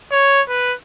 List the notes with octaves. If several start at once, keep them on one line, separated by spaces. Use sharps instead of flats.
C#5
B4